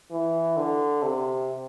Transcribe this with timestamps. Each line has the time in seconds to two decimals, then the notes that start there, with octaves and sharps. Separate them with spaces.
0.11 E3
0.57 D3
1.02 C3